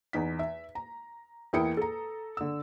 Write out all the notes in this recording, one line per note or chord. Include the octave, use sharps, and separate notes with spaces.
E2 D#4 B6
E5
A#5
E2 A#3 E4 G5 D#6 C#7
A4 A#5
D3 E6